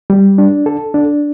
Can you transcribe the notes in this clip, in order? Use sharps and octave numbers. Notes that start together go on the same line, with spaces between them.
G3
D4
A4
D4